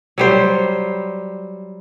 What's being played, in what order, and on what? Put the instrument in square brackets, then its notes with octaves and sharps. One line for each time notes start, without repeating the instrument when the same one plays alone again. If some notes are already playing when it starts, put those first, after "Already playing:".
[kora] F#3 G3 C5